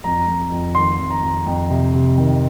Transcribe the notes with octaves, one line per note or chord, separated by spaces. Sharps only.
F2 A#5
F2
F2
D#3 C6
F2
A#5
F2
F2
C3
C3
D#3